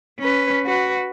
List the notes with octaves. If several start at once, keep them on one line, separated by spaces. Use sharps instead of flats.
C#4 B4
F#4 B4